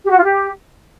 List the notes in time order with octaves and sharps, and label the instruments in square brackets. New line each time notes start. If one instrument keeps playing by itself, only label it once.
[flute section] G4
F#4
F4
G4